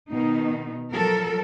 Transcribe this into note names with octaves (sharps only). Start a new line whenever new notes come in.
B2 D#3 D#4
F3 F#3 A4 A#4